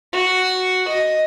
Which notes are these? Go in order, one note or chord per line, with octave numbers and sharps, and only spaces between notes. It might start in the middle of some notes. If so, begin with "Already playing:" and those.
F#4
D#5